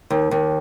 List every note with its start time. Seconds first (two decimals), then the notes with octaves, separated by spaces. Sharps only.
0.10 D#2
0.31 D#2